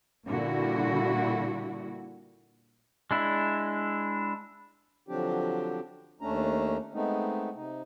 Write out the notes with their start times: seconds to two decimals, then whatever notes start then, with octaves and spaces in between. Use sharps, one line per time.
0.28 A#2 D3 G3 E4 F#4
3.11 G#3 D4 E4
5.09 D3 F3 F#3 C4 D4 G4
6.21 D#2 A3 C#4 D4 A#5
6.94 G#3 A3 B3 C4 D#4
7.55 C3 D#4